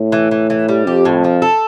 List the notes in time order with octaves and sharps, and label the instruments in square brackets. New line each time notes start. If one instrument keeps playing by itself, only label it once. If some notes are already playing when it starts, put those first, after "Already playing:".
Already playing: [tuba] A2
[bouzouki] E3
E3
E3
G3
[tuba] F2 [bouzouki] G4
[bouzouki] A2
F3
A4